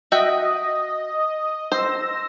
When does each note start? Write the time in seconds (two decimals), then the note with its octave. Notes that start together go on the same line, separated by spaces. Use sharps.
0.12 F#4 D#5 E5 G5
1.72 C5 E6 A#6